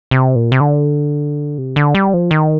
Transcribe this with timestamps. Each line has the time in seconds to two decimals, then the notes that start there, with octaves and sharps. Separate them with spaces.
0.11 C3
0.36 A#2
0.52 C3
0.61 D3
1.58 C3
1.76 D3
1.95 G3
2.14 F3
2.31 D#3